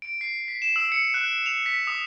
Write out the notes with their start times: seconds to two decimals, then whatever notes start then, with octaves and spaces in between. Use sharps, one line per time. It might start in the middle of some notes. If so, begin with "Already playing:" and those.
0.02 D7
0.21 C7
0.48 B6
0.62 E7
0.76 E6
0.92 C#7
1.14 F#6
1.46 F7
1.66 B6
1.87 D#6